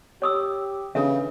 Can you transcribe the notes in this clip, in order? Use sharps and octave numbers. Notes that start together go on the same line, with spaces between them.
G4 C#5 D#6 E6
C#3 E3 D4 A4 E5